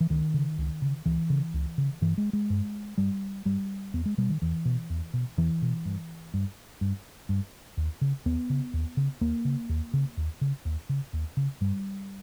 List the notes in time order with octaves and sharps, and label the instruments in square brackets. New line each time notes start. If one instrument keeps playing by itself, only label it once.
[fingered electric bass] E3
C#2 D#3
C#3
C#2
C#3
C#2 E3
C#3
C#2
C#3
G2 E3
G#3
G#3
G2
G2 G3
G2 G3
E2 B3
G#3
B2 G3
D#3
E2 E3
B2
E2
B2
E2 E3
B2
G2
G2
G2
G2
D#2
C#3
D#2 B3
C#3
D#2
C#3
D#2 A#3
C#3
D#2
C#3
D#2
C#3
D#2
C#3
D#2
C#3
G2 G3